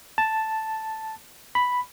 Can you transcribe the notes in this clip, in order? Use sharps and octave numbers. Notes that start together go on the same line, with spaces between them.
A5
B5